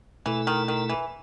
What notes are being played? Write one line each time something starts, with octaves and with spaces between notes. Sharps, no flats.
B2 E3 A3 E4 A4
D#3
D#3
E3